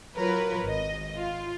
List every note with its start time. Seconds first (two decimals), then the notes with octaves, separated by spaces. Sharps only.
0.16 F#3 F4 A#4 B4 C#5
0.65 G#1 D#5
1.17 F4